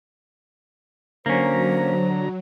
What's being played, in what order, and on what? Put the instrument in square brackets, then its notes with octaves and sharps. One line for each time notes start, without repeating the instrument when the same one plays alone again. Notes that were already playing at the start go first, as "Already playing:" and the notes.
[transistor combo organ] D3 A#5 [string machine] F#3 [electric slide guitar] A#3 C#4 [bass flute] C5